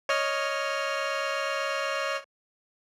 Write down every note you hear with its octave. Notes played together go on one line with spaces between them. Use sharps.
C#5 D#5 F6